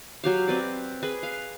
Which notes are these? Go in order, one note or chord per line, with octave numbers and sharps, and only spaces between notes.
F#3 G4 F5
C4 B4 D5
G#4 B4
F5